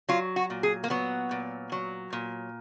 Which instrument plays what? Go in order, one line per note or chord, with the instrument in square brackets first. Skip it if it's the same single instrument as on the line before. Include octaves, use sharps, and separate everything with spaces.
[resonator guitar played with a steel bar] F#3 F4
F#4
A#2
G#4
A#3
F#3 B3
A#2
F#3
A#2